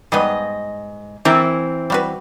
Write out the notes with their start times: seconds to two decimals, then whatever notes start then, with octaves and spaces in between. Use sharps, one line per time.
0.12 G#2 G3 B3 D#5
1.25 E3 C4 G4 A#4
1.90 G3 F#4 B4